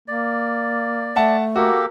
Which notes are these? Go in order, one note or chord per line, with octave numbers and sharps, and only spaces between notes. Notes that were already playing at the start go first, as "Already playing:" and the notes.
A#3 D5
A3 E5 F#5 A5
A#3 F#4 G4 A4 A#4